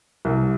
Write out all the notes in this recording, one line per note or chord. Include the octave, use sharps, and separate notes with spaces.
C2